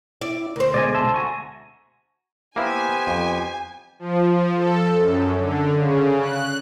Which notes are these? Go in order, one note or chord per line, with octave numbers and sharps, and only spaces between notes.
E4 D5
D2 A#4 C5
B2 G#3 D5 D#5 G#5
E5 A5 C6
F#4 G#5 A#5 C#6
A#3 B3 E4 G4 C5 G#5
F2
F3
A4
F#2
D3
C#3
F#6